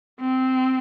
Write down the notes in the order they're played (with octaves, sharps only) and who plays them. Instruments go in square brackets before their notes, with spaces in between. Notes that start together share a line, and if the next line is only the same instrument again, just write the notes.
[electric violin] C4